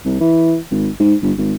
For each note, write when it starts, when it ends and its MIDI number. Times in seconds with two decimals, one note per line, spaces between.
0.05 0.20 36
0.21 0.56 52
0.71 0.89 32
1.00 1.15 44
1.22 1.33 31
1.38 1.54 32